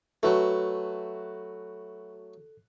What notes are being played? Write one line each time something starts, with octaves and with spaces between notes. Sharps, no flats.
F#3 A3 F#4 A4 B4